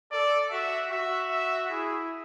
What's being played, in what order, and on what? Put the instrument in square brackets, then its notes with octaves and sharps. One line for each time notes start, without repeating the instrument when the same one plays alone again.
[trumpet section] A4 [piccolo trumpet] D5
[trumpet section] F#4 [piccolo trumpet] E5
[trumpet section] F#4 [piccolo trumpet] E5
[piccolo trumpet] E5
[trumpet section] E4 [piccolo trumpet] G#4